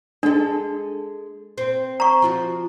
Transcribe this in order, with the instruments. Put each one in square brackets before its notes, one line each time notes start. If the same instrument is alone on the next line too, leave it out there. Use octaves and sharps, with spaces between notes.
[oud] G#3 A4 [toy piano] D4
[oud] C4
[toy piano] A#5 C#6
[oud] F3 F4 F#4